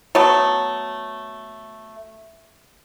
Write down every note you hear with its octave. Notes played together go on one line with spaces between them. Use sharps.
F#3 A3 B3